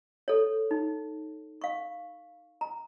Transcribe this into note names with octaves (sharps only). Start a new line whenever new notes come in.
A4 C#5
D#4
F5 C#6
A#5